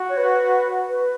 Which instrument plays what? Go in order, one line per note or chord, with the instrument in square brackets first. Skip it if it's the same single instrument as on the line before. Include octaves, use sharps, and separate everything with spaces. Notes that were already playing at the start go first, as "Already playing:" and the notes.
Already playing: [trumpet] F#4
[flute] C#5
B4
B4